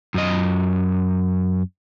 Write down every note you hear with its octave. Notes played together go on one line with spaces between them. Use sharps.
F#2 D#5